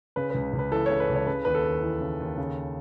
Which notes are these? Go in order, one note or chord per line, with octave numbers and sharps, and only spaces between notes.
C#3 B4
C#2 B4
C#2
B4
E3 A4
C#3 C#5
B4
C#2 C#5
C#3 B4
D#2 B4
A4
D#2
E3
C#3
D#2
C#3